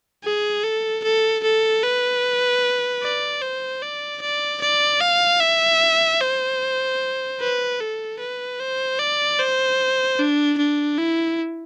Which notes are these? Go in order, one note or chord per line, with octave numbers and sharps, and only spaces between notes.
G#4
A4
A4
A4
B4
D5
C5
D5
D5
D5
F5
E5
C5
B4
A4
B4
C5
D5
C5
D4
D4
E4